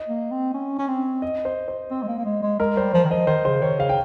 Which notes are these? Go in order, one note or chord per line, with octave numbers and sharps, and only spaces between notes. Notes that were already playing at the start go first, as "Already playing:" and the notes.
Already playing: D#5
A#3
C4
C#4
C#4
C4
D#5
C5
C5
C4
G#3
A#3
A#3
G#3
G#3
G#3 A#4
G3 C5
F3 C5
D#3
F3 D#5
D#3 C5
C#3 C5
D#3 C#5
C#3 F5
G5